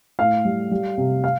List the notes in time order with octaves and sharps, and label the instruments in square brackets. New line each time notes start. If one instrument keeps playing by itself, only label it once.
[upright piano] A2 F5
G3
G3
C3
F5